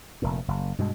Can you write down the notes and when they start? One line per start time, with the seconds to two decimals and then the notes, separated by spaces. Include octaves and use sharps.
0.22 F1 A#2
0.48 F#1
0.78 G2 B2 G#3